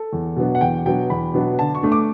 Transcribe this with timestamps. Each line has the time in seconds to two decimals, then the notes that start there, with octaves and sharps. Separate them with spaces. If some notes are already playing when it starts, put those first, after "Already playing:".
Already playing: A4
0.13 E2
0.36 B2 F#3 B3 D4
0.55 F#5
0.61 E2 G5
0.85 B2 F#3 B3 D4 G5
1.10 E2 B5
1.34 B2 F#3 B3 D4
1.59 D3 A5
1.75 C#6
1.83 A3 D4
1.92 D6